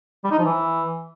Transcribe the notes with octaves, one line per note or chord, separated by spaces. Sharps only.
G3
D#4
F3
E3